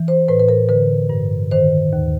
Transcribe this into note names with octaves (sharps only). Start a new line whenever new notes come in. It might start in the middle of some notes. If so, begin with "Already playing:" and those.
Already playing: E3
C5
A2 B4
B4
A#4
D3 B4
G2
D#3 C5
D#2